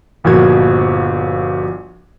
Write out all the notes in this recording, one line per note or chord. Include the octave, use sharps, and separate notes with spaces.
G1 A#2 F3 F#4 G#6